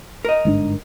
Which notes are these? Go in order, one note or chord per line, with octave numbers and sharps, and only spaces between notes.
A#4 D#5
G1 G#2 D4